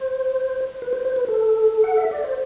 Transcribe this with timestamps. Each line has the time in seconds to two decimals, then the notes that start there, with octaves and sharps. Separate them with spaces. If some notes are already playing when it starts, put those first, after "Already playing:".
Already playing: C5
0.82 B4
0.93 C5
1.05 C5
1.16 B4
1.28 A4
1.84 F#5
1.97 E5
2.11 D5
2.24 C5